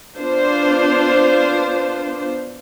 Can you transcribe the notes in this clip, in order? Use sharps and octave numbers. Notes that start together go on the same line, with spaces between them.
B3 D4 F4 C5